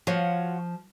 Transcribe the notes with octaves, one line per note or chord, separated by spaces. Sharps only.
F3 F4 F#4 C#5